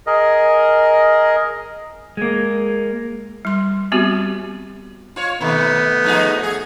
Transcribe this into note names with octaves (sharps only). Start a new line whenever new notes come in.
G#4 A#4 D#5
G#3 A#3
G3 C6
G3 B3 C4 F#4 G4
F4 C#5
B2 D#3 A3 B3
F3 D#4 G#4
G#4